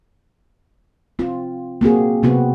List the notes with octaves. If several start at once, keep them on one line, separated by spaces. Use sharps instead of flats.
C4 F4
A#3 C4 F#4 G#4
C3 B3 C4 F#4